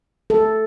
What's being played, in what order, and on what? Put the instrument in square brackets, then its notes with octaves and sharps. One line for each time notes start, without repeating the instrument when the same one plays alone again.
[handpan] A4